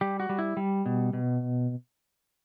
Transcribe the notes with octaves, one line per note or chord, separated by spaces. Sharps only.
G3 G4
F#4
G3
E4
G3
B2
B2